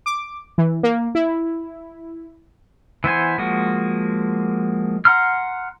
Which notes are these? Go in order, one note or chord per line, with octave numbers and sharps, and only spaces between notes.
D6
E3
A#3
E4
E3 B3 C5 G#5
F3 G#3 A#3 F#4
F#5 A#5 C6 F6